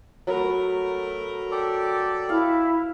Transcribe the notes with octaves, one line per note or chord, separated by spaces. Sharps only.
F#3 A3 A#4 B4
G4 A4 D5
E4 F5